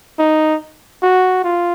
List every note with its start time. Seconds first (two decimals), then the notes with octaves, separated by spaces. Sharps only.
0.19 D#4
1.02 F#4
1.44 F4